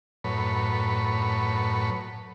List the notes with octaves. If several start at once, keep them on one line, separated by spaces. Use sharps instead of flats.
F#2 A2 B4 C#5